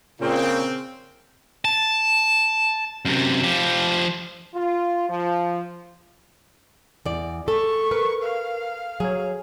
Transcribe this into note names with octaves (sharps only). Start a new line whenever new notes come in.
A#2 C#3 C4 G5
A5
F#2 C3
F3 G4
F4
F3
E2 D5
G#4 A4 C#6
A#4 B4
F5
F#3 G#4 C#5